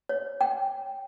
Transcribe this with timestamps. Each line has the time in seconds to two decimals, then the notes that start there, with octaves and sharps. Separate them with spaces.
0.09 C#5
0.41 G5